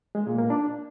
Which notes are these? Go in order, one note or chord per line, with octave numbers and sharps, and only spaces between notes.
G#3
A#2
A#3
D4